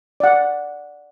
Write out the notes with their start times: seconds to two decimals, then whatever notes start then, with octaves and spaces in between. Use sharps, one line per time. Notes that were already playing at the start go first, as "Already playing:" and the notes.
0.20 D5 F#5